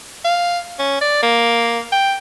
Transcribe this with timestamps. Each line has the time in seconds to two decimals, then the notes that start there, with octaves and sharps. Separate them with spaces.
0.24 F5
0.79 C#4
1.01 D5
1.22 A#3
1.92 G5